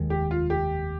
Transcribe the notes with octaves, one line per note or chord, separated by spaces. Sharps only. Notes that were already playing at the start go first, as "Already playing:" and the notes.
Already playing: F1 D#2 D#3 G#3
G4
F4
G4